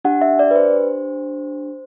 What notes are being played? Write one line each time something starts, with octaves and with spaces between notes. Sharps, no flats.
D4 G4 F#5
E5
D5
B4
C5